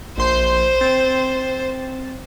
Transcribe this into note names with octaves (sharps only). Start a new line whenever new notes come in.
A#1 C5 C6 G6
C4 A6